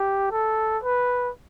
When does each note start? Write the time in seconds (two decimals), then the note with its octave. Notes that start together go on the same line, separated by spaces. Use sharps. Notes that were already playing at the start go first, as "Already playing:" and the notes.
Already playing: G4
0.31 A4
0.83 B4